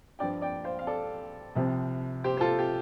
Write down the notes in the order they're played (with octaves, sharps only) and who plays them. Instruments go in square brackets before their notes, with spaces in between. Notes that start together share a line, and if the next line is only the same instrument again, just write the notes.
[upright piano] G2 F3 D5 G5
D5 G5
C5 F5
F5
A4 D5
C2 C3 F3
G4 C5
C5
F4 A4
G4